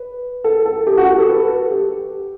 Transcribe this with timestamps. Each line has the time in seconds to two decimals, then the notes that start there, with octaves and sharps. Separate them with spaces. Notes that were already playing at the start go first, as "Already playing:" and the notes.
Already playing: B4
0.44 A4
0.66 A4
0.87 G4
0.97 F#4
1.08 G4
1.19 A4
1.29 B4
1.51 A4
1.71 G4